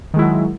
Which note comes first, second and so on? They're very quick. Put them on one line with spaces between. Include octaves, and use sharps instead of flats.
D#3 G#3 E4 F#3